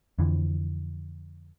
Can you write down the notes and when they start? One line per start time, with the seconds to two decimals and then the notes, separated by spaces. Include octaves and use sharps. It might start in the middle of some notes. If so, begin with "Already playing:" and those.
0.19 F2 D3 E3 F3